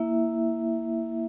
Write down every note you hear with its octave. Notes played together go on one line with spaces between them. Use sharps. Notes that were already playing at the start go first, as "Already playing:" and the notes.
Already playing: A#3 E4 E5